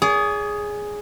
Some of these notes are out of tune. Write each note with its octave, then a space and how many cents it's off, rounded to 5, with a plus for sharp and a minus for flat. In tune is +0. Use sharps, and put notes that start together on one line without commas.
G#4 +0 D5 -45